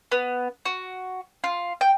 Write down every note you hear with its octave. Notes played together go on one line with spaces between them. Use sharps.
B3
F#4
F4
G5